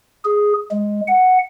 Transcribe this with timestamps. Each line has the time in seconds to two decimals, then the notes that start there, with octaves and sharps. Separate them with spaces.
0.25 G#4
0.71 G#3
1.08 F#5